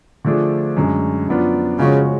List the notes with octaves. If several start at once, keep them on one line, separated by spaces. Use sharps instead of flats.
D3 F3 A3 D4 G#4
F#2 D3 G#3
F#2 F3 B3 D4 F4
C#3 F3 G#3 C#4 F#4